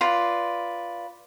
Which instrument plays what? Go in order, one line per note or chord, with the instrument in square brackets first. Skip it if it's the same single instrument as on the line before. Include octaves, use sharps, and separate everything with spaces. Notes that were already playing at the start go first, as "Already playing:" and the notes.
[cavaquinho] F4 B4 D5